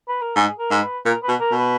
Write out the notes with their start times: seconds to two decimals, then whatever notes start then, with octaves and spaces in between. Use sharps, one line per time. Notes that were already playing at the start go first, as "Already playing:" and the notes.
0.08 B4
0.22 A#4
0.36 G#2 G#4
0.58 A#4
0.71 G#2
0.82 B4
1.05 A#2 A#4
1.23 B4
1.28 B2
1.40 A#4
1.52 B2
1.58 B4